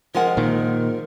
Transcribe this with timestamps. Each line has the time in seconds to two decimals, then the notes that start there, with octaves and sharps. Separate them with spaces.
0.14 F3 G#3 A#4 F#5
0.37 A#2 D#3